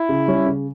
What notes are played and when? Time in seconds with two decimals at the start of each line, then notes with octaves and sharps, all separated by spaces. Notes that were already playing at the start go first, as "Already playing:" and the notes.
Already playing: E4
0.09 C#3
0.28 G3 C#4
0.46 C#3